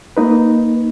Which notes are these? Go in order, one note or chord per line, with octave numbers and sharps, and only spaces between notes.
A#3 D#4 B4